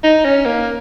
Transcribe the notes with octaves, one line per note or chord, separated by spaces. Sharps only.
D#4
C#4
A#3